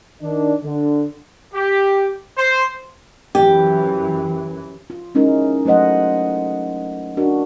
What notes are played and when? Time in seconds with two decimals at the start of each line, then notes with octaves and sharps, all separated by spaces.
0.22 D#3 D4
0.63 D3
1.54 G4
2.37 C5
3.35 F#2 E3 G4
4.90 F4
5.15 G#3 C#4 D#4 E4 A#4
5.65 F#3 A3 C5 D#5 F#5
7.17 D4 F#4 A#4